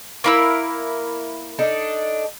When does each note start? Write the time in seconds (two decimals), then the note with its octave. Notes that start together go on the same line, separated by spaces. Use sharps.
0.24 A#3 E4 A#4 F5 E6
1.59 D4 D#4 A4